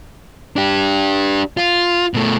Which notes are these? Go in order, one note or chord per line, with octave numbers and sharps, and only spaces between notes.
D4 G4
F4
B2 A3